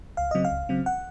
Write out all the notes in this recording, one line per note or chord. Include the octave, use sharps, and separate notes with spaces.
C#2 F5
C#3 F#3 C4 D#5
F5
C#2
C#3 F#3 C4
F#5